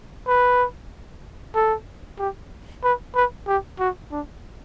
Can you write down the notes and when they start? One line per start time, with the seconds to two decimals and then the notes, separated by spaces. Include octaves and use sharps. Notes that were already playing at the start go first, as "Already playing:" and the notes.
0.27 B4
1.55 A4
2.19 G4
2.83 B4
3.15 B4
3.47 G4
3.80 F#4
4.11 D4